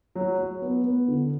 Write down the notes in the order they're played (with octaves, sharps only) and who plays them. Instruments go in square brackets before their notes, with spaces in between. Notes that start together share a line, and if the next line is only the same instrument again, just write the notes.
[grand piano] F#3
F#3
B3
B3
D3